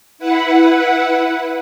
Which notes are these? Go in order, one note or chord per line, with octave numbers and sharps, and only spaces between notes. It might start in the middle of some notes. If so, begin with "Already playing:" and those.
E4 B4 F#5